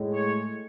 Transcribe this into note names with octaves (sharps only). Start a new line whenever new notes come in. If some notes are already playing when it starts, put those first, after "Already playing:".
Already playing: A2 G#3
C#5